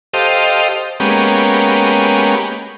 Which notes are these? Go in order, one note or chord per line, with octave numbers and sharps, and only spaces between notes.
G4 A4 C5 D#5 F5
G#3 A#3 B3 C#4 G4